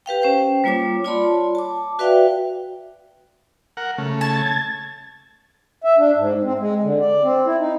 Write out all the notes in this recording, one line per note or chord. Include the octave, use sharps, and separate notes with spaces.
G4 B4 F5 G5
C#4 C5 G5
G3 A#3 F4 C#5 D6
F4 C#5 D5 A5 B5 C6
A5 D6
F#4 B4 D5 E5 F5 G5
A#4 F#5
C#3 A3
A5 G#6 A6
E5
D4
G#2
C4
G#3
D3
D5
C4
E4
D#4